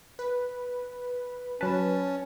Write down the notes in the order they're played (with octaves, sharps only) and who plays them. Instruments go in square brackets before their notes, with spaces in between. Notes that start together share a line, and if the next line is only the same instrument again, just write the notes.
[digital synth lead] B4
[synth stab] F#3 B4 [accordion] C#4 [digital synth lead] A5